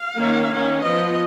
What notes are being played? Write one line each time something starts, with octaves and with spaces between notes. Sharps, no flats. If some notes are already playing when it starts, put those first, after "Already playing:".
Already playing: F5
D#3 A#3 C#4
D#3 A#3 C#4
F3 B3 D#5